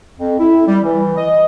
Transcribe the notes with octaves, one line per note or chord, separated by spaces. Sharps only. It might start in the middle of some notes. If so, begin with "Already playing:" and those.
F2
E4
G3
E3
D#5